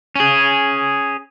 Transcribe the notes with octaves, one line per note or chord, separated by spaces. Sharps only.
C#4 G#4